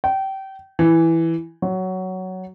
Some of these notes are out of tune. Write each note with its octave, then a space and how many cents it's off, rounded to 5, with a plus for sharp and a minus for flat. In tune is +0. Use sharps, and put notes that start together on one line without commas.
G5 -25
E3 +0
F#3 +10